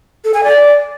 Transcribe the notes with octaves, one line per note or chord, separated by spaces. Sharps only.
A4
G#5
D5